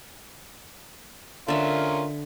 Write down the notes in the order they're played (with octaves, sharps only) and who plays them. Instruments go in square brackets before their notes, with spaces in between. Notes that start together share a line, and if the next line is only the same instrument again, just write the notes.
[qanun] D3 E5 [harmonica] C#4 F4 A#4